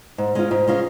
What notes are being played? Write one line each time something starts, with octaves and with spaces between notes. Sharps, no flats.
G#2
G#3 C#4 F4
G#2
G#3 C#4 F4